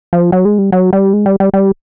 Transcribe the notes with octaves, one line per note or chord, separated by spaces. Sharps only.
F3
F#3
G#3
G3
F#3
G3
G#3
G3
G3
G3